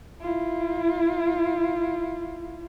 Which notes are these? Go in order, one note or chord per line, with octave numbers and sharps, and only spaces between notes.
E4 F4